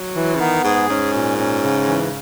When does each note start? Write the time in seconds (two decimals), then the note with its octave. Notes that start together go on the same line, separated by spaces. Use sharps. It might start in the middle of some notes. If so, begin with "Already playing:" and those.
Already playing: F#3
0.16 E3
0.35 C#3
0.40 D#3 B3
0.64 G#2 G#4
0.89 G#2 C#4
1.14 A#2
1.39 C#4
1.64 C#3
1.88 E3